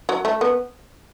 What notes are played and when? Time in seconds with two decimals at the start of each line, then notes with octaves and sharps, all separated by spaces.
0.09 F#3
0.25 A3
0.41 B3